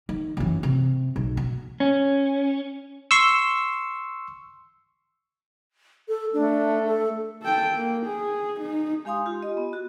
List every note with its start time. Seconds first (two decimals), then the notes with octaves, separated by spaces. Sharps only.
0.09 D#3
0.37 F#2 E3
0.63 C3
1.16 B1
1.37 B2
1.80 C#4
3.11 C6 C#6 E6
6.08 A4
6.33 A3 D4
6.87 A4
7.42 A4 G5
7.76 A#3
8.07 G#4
8.61 D#4
9.05 G#3 G4 F5 G#5 C6 D#6
9.26 F4 G4
9.43 D#5
9.57 B3
9.73 F#4